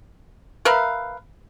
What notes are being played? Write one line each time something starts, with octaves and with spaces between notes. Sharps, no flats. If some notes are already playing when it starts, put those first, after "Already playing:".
A#4 B4 E5 F5